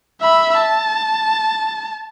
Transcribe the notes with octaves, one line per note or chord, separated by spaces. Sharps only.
E5 B5
A5